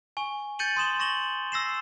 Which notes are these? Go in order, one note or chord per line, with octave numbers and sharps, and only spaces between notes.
G#5 C#6
G6 A6 C#7 D#7 F#7 G7
C6 D#6 E7 G7
C#6 A#6 E7 F#7 G7
E6 A#6 C7 E7